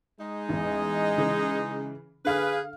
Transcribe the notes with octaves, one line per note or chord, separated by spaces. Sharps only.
G#3 D#4
A1 E2
C#3 E3
D3 G#4 B4 F5 F6